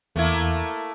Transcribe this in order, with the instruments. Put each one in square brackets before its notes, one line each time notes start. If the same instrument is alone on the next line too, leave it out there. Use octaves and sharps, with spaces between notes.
[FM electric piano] E2 [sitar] A3 A#3 E4